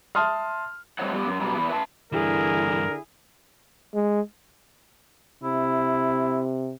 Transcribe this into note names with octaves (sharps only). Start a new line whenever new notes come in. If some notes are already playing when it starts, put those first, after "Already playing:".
E5 A5 C6 D#6 F6
G3 A3 C4 D#4 C#5 F#5
G3 B3 G4
F#2
G2 B2 F#3 G3
E2 E4
B4 E5 A5
G2 D3 E3 E4 G#4 A#4
G#3
C3 E4